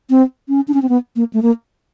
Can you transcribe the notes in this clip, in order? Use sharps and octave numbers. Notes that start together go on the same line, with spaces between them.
C4
C#4
D4
C#4
C4
B3
A#3
A3
A#3